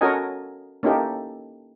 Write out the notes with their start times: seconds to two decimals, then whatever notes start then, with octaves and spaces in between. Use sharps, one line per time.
0.01 C#4 F#4 A4 A#4 D#5 G#5
0.83 A#3 C#4 D#4 E4 G4 A4